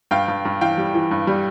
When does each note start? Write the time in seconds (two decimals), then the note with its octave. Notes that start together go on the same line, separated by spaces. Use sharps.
0.11 G2 F5 G5
0.28 G2
0.45 G2
0.61 E3 F5 G5
0.78 G3
0.94 E3
1.11 G2
1.27 G3